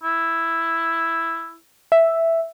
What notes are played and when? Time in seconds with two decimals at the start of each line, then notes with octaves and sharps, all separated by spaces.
0.03 E4
1.92 E5